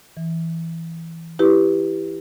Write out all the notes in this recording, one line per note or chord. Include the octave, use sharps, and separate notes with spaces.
E3
E4 G4 B4